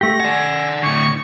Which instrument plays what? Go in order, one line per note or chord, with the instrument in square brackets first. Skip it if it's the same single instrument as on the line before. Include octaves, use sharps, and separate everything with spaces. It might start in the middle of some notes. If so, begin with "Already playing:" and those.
[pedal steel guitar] A3 G4 [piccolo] A#6
[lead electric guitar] D5 F#5 [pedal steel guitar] G#5
[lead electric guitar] A2 D3 [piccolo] C#6